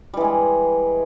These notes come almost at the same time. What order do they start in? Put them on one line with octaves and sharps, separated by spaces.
G3 E3 G#3 G#4